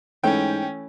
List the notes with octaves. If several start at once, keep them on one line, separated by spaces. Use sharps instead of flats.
G#2 E3 A3 C#4 G5